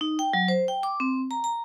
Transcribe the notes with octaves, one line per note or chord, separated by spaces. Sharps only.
D#4
G5
F#3
C5
G5
D6
C4
A#5
A#5